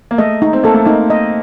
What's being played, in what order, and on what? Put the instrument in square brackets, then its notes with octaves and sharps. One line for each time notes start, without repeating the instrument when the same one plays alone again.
[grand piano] A#3
[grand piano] A3 [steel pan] D#5
[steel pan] D#4
[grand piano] C4
[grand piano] A#3 [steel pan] A4
[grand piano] A3
[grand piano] A#3 [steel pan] D#4
[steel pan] D#5